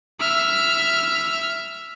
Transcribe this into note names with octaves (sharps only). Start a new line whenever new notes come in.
E5 F6